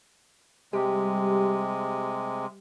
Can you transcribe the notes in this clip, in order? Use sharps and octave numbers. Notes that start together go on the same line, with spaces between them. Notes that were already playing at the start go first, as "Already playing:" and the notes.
C3 G3 G#3 G4